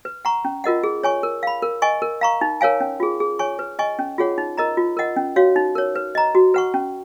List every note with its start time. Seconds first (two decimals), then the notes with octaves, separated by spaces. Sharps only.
0.05 B4
0.25 F#5 A#5 C#6
0.45 C#4
0.64 F4 A#4 D#5 F#5
0.84 G#4
1.03 C#5 G#5 C#6
1.23 A#4
1.43 F5 B5
1.62 A#4
1.82 D#5 G#5 C#6
2.02 A#4
2.21 F5 A#5 C#6
2.41 D#4
2.61 A#4 C#5 F5 G#5
2.80 C#4
3.00 F4 G#4
3.20 G#4
3.39 C#5 G#5 C#6
3.59 B4
3.79 D#5 G#5 C#6
3.99 C#4
4.18 F4 G#4 C#5 F#5
4.38 D#4
4.58 A#4 D#5 A#5
4.77 F4
4.97 A#4 D#5 F#5
5.16 C#4
5.36 F#4 C#5 F5
5.56 D#4
5.75 A#4 C#5
5.95 B4
6.15 D#5 A#5
6.35 F#4
6.54 B4 F#5 C#6
6.74 C#4